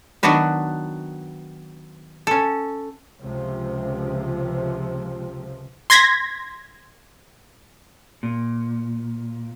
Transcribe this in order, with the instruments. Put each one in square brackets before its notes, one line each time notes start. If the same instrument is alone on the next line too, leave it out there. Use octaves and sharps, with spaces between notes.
[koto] D#3 F#3 B3 D4 F#4 B4
C#4 A4
[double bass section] C#2 C3 F3
[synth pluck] C6 G#6 A#6 B6
[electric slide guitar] A#2